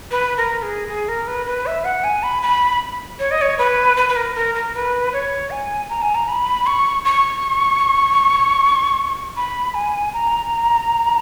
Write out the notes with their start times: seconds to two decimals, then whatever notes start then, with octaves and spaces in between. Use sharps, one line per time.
0.11 B4
0.37 A#4
0.62 G#4
0.88 G#4
1.08 A#4
1.27 B4
1.46 B4
1.66 E5
1.85 F#5
2.04 G#5
2.23 B5
2.43 B5
3.19 C#5
3.31 D#5
3.42 C#5
3.59 B4
3.97 B4
4.09 B4
4.16 A#4
4.35 A#4
4.55 A#4
4.75 B4
5.13 C#5
5.51 G#5
5.90 A#5
6.02 G#5
6.15 A#5
6.28 B5
6.66 C#6
7.05 C#6
9.37 B5
9.74 G#5
10.14 A#5